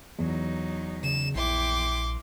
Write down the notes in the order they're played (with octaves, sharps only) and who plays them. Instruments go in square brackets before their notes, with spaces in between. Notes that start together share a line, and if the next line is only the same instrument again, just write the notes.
[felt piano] E2 [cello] F#3 D#4
[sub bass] C#3 [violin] E7
[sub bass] A#1 [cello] E4 G5 [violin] C6 D6